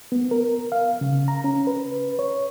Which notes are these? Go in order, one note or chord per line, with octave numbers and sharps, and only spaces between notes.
B3
A#4
F5
C#3
A#5
C#4
B4
C#5